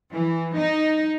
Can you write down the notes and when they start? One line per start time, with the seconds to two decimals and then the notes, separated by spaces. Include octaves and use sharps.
0.11 E3
0.55 D#4